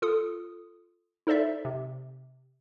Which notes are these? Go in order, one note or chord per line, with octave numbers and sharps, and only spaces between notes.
F4 A4 D#6
D#4 A4 C5 D5 E5
C3